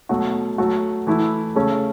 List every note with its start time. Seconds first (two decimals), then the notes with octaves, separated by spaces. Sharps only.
0.09 B2 F#3 A3 F#4
0.58 F#3 A3 F#4
1.07 E3 A3 E4
1.55 C#3 A3 C#4 A4